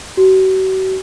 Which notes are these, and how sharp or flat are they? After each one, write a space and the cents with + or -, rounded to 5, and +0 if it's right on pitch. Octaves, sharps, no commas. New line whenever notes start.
F#4 +40